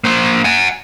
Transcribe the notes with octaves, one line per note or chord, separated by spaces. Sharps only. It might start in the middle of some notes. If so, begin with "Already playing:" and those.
A#3 C5
F#5 G#5